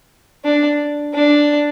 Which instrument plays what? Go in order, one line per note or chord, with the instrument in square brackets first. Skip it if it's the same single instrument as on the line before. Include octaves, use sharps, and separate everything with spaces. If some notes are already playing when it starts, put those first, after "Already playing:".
[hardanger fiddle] D4
D4